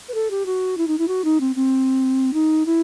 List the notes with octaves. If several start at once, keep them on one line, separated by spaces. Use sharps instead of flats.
B4
A4
G4
F#4
E4
D#4
E4
F#4
D#4
C4
C4
D#4
E4